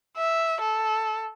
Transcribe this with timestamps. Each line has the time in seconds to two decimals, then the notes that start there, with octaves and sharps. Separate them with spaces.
0.17 E5
0.61 A4